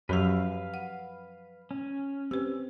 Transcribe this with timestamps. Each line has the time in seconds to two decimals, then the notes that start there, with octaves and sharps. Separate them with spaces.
0.09 F#2 F3 F#3 G4 B4 F5
0.74 F#5
1.71 C#4
2.31 C4 G4 B4